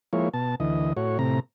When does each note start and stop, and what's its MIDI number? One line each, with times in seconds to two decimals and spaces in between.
0.13 0.29 53
0.13 0.29 56
0.13 0.29 58
0.13 0.29 64
0.13 0.29 73
0.34 0.55 47
0.34 0.55 81
0.60 0.93 38
0.60 0.93 52
0.60 0.93 75
0.97 1.18 45
0.97 1.18 66
0.97 1.18 73
1.19 1.40 45
1.19 1.40 48
1.19 1.40 82